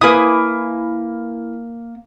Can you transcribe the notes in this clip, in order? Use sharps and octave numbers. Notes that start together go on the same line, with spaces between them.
A#3 E4 B4 G#5 D#6